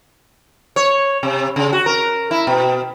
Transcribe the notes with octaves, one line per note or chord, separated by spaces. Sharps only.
C#5
C3
C#3
F#4
A#4
E4
B2